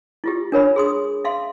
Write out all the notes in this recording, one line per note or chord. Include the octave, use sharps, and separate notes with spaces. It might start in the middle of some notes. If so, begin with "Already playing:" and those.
E4 F4 G4
D4 A#4 C#5 B5
G#4 C6 D#6
E5 F5 C6